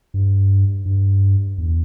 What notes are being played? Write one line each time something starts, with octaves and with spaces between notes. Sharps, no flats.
G2
G2
E2